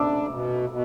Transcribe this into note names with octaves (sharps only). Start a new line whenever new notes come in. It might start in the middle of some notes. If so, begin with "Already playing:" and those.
Already playing: D4 D6 E6
B2
B2